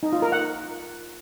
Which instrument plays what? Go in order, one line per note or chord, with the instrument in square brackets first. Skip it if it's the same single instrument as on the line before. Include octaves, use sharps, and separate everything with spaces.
[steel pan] D#4
F4
A#4
F#5